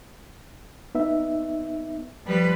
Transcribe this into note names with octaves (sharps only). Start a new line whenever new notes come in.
B3 D#4 E5
F3 G3 B4